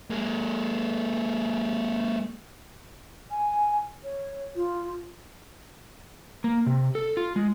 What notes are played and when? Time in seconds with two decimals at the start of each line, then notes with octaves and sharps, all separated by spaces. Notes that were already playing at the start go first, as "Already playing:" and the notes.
0.10 G#3 A#3
3.30 G#5
4.04 C#5
4.56 F4
6.44 A#3
6.66 C3
6.95 A4
7.17 F4
7.36 G#3